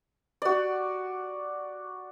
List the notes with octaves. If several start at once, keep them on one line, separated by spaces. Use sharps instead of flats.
F#4 D5